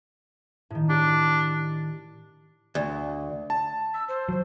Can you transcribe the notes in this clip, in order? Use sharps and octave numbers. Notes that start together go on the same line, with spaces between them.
A2 D#3
D4 G4
D2
A5
E6
C5
F#3